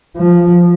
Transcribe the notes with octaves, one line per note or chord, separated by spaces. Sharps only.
F3